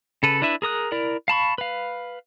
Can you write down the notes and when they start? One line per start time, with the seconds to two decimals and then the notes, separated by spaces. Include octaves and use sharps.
0.23 C#3 A4 B4
0.42 D4 E4 B4 E5
0.62 G#4 A#4 D#6 F#6
0.92 E4 A#4 D5
1.28 F5 A5 B5 C#6
1.58 B4 F5